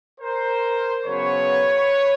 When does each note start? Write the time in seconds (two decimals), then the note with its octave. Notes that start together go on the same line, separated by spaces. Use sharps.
0.21 A#4 C5
1.04 C#3 F#3 B3 B4 C#5